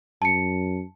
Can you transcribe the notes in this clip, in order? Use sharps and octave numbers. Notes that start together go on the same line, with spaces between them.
F#2 A5 C#7